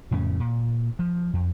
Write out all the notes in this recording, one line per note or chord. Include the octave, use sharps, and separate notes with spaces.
F2 A2 C#3 C#4
A#2
F3
F2